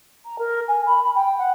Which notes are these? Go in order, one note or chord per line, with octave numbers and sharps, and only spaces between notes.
A#5
A#4
G#5
B5
B5
G5
F#5